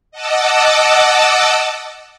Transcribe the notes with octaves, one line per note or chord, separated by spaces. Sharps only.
D#5 F#5 A5 D6 E6